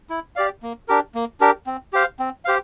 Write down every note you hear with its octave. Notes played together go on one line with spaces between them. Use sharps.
E4
G4 D5 F5
A#3
D4 G4 A#4
A#3
D4 G4 A#4
C4
G4 C5 F5
C4
G4 C5 F5